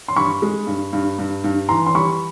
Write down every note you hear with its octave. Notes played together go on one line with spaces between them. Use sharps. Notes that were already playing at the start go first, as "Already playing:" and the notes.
C6
G2 B5 C#6
G#3
G2
G2
G2
G2
E3 A#5 C6
C6
G3 B5 C#6